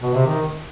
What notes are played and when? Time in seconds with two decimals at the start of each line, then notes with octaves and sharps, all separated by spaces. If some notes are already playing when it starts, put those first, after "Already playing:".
0.02 B2
0.14 C3
0.26 D#3